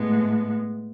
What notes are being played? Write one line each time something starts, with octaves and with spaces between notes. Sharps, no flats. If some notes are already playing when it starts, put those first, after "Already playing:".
Already playing: A2 G#3 B3